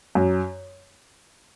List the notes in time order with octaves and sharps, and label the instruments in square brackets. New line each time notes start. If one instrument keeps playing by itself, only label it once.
[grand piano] F#2